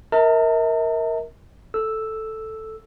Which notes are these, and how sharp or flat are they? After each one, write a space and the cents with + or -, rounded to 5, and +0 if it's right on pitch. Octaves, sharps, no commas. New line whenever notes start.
A#4 +0 E5 -45 A5 +45
A4 +0 E6 +0